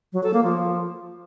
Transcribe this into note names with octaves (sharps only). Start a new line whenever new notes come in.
F#3
A4
A#3
F3